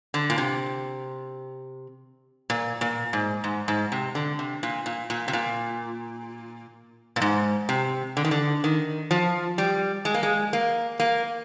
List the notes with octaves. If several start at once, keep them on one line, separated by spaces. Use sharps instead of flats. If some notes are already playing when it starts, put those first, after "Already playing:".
D3
A#2
C3
A#2
A#2
G#2
G#2
G#2
C3
D3
C3
A#2
A#2
A#2
C3
A#2
A#2
G#2
C3
D3
D#3
D3
D#3
F3
G3
G#3
A#3
G#3
A#3
A#3